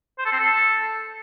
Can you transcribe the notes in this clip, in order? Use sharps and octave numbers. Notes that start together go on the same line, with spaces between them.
C5
A4
C4
A4